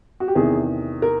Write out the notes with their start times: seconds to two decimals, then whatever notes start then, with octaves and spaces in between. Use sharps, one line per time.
0.20 F#4
0.28 G4
0.35 E2 C3 D#3 G#4
1.02 A#4